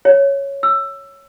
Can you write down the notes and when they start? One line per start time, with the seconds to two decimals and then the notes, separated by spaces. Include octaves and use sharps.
0.05 C#5
0.63 E6